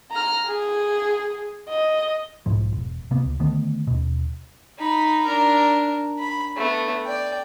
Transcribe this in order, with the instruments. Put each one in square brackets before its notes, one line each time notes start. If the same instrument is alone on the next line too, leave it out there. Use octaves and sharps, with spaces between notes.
[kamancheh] A#5 F6
G#4
D#5
[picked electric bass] B1 G#2 F3
E1
C3 A#3 B3
C#2
D3 D#3 A3 B3
D#2 B2
[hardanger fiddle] D#4 B5
D4 A#4
B5
A3 B3
D5 G5